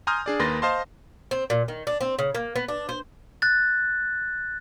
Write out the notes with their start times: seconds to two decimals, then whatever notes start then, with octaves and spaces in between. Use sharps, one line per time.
0.07 G#5 A#5 C6 D#6 F6 G6
0.26 D4 G#4 D5
0.39 D#2 A#3 B4 C6 A6 A#6
0.62 C5 D#5 F5 A5 C6
1.31 C4
1.50 A#2
1.68 D#3
1.87 D4
2.01 C4
2.19 C#3
2.35 A#3
2.56 B3
2.68 D4
2.89 C5
3.42 F#6 A6